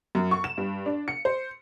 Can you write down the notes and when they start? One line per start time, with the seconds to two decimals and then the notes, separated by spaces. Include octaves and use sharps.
0.15 F#2
0.31 C#6
0.44 E7
0.58 G2
0.86 D4
1.08 C#7
1.25 C5